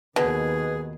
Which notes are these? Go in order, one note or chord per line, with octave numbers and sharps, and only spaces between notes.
D#2 B2 D#3 G#4 B4